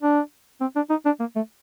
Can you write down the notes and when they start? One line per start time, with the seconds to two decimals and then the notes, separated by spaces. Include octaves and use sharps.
0.02 D4
0.61 C4
0.76 D4
0.90 D#4
1.06 D4
1.20 A#3
1.36 A3